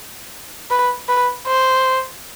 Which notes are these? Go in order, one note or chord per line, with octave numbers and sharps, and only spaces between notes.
B4
B4
C5